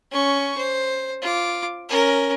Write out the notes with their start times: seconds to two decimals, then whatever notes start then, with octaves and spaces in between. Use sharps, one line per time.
0.12 C#4 C#6
0.57 C5
1.22 F4 D6
1.89 C#4 A#4